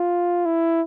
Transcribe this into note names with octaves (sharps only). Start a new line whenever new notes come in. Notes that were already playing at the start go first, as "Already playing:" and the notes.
Already playing: F4
E4